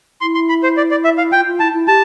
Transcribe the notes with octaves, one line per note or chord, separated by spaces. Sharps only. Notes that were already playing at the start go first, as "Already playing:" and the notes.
E4 C6
C6
B5
C5
D5
D5
E5
F5
F4 G5
F4
E4 A5
E4
G4 A5